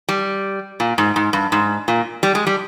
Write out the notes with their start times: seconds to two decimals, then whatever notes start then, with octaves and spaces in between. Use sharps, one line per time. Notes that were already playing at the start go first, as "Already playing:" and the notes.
0.09 G3
0.80 A#2
0.98 G#2
1.16 G#2
1.33 G2
1.52 G#2
1.88 A#2
2.23 G3
2.35 G#3
2.47 G3